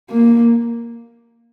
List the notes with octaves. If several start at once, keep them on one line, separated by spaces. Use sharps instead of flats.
A#3